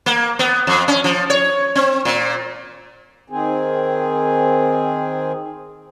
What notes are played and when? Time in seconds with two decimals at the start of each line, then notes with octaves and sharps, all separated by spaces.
0.06 A#3
0.39 B3
0.67 F2
0.88 C#4
1.04 F3
1.30 C#5
1.75 C4
2.05 A#2
3.30 D#3 C4 G#4